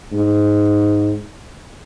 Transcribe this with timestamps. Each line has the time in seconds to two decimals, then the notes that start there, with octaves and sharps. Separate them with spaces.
0.12 G#2